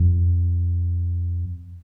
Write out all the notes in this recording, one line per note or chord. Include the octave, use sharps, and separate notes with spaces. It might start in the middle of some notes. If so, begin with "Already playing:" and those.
Already playing: F2